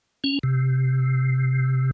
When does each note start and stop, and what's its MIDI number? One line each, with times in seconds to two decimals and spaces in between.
0.24 0.39 61
0.43 1.91 48